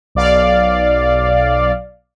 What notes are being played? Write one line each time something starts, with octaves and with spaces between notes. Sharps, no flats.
B1 D5 F5